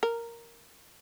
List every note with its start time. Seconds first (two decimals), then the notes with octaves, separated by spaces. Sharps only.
0.03 A#4